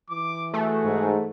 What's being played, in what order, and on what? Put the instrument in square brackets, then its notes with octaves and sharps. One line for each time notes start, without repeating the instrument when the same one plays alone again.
[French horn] E3 [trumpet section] D6
[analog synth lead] A3 [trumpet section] F#4 G#4
[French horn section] G#2